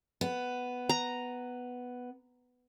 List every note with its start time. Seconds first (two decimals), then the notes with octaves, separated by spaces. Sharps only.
0.21 B3
0.89 A#5